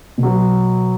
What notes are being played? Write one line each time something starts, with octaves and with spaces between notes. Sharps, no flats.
B2
F#3